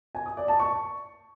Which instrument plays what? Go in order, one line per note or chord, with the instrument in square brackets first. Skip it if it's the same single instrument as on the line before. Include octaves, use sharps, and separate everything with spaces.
[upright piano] G#5
D#6
D5
A5
C#6